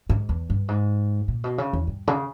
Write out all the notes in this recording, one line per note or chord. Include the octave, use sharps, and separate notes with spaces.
G#2
E2
G2
G#2
A#2
B2
C#3
E2
G2
C#3